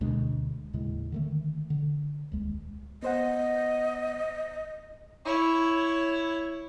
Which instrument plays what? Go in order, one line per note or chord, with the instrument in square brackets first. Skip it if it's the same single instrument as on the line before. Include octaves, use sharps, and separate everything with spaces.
[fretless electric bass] D2 B2 G#3 D4
D#2 A2 C#3 G#3
D3 D#3 A3
D3
D#1 C#2 G#3
[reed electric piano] B3 C5 F#5 [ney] D#5
[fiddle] E4 C#5